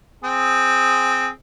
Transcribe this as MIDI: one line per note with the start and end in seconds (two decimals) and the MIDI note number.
0.24 1.29 60
0.24 1.29 68